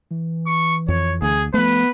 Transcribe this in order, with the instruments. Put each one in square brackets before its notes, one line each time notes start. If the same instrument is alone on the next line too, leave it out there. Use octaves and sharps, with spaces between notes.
[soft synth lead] E3
[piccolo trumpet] C#6
[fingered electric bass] F2 [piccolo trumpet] C#5
[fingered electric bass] D2 [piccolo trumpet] G#4
[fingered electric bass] F3 A3 [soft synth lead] B3 [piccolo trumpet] B4